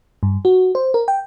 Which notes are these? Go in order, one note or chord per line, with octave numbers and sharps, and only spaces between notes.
G2
F#4
C5
A#4
G5